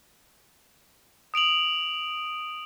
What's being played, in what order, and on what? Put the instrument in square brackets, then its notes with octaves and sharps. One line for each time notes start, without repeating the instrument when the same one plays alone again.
[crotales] D#6 D7 F7 F#7